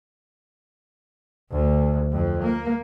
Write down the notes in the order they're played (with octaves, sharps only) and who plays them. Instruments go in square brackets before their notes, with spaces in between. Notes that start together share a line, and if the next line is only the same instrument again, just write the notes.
[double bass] D2
F2
A#3